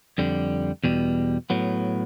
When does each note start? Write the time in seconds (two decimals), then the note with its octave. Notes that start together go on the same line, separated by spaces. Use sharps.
0.18 F2 D3 G3
0.84 E2 B2 G3
1.50 A2 F#3 B3